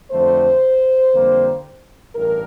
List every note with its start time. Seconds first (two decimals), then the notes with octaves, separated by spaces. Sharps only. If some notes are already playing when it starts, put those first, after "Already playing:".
0.11 F2 D3 A3 C5
1.13 F2 D3 G3 A#3
2.14 A1 G2 A#4